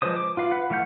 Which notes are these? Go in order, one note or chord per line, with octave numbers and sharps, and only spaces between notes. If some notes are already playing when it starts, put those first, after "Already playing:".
F3 G#3 B4 C5 D#6
D6
F4 B4 F5
B4 F#5
E3 A3 F5 F#5 G6